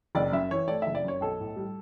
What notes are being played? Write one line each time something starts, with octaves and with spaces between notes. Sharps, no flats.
F#1 D5
F#2 E5
E3 C#5
A3 D5
F#1 E5
D5
F#2 C#5
B1 A4
A2
G3